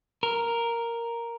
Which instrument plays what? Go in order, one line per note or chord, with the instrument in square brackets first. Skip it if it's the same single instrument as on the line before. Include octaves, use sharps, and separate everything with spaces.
[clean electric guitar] A#4